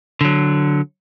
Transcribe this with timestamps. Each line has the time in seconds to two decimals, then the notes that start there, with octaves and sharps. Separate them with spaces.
0.21 D3 F#3